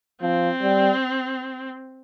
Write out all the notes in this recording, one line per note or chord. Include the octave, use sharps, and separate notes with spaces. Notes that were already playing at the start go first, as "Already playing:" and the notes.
F3 C4
G3